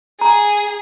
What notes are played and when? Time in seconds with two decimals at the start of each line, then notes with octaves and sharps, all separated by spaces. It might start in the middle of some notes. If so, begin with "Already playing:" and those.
0.21 G#4 A#5